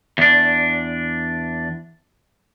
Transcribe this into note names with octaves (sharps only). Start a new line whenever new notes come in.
E2 D4